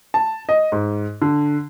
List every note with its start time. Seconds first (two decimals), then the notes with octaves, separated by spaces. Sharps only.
0.14 A5
0.49 D#5
0.72 G#2
1.22 D3